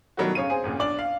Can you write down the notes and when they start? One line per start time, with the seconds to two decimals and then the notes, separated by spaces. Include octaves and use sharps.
0.17 B2 D#3 F#3 G3 A3 F#4
0.35 C#3 C#5 F5 D#7
0.50 C4 G#4
0.64 A1 F2 A#2 C#3
0.79 B1 D4 D5 D6 F#7
0.99 F5